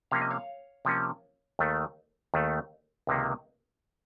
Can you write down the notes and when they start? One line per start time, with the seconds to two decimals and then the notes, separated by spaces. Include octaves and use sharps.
0.11 C3 F3 A#3 C#4 F5
0.22 D#5
0.31 C#5 F5
0.85 C3 F3 A#3 C#4
1.59 D#2 D#3 A3
2.34 D#2 D#3 A3
3.07 C#2 C3 D#3 A#3